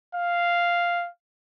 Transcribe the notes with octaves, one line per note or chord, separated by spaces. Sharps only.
F5